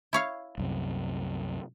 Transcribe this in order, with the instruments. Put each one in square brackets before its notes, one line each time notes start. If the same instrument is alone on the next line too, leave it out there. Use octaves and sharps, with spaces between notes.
[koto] E4 C#5 F5
[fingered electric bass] C2 F#2 C3